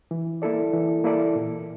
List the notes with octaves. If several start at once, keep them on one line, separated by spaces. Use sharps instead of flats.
E3
A#3 E4 A4 D5
E3
A#3 E4 A4 D5
A#2